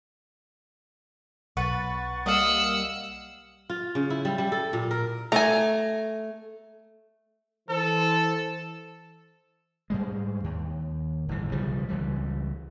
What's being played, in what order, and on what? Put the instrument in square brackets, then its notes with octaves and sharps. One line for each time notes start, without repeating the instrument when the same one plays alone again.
[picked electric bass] B1 [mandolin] B4 [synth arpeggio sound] F#5 C#6 A6
[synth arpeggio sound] G3 A#3 [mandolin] D#5 F5 [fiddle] F#5 E6
[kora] F4
C#3
E4
G3
G3
A4
A#2
A#4
[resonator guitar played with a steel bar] A3 [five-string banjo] G#5 A#5
[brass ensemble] E3 C5 [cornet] A4
[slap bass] G#2 G3 G#3
D#2
G1 A2 E3
B1 C#3 F3 G3
C#2 E3 G3